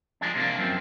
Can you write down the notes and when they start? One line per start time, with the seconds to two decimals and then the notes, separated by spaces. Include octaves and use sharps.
0.21 F3 G3 G#3 D4
0.36 C3 A#3 D4
0.58 F#2 F3 C4